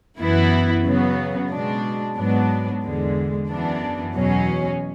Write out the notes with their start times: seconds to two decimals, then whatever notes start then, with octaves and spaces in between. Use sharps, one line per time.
0.19 F#2 E3 B3 E4
0.84 C#3 F#3 B3
1.51 B2 G#3 D4
2.16 G#2 F#3 B3 D4
2.83 E2 D3 G#3
3.48 F#2 E3 B3 D4
4.15 E2 B2 F#3 C#4